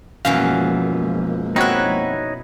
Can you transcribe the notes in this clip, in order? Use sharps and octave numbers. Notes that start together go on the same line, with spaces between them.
F#2 B2 E3 F3 G#3 A#3 F5
C4 D#4 E4 F#4 B4 C#5 F#6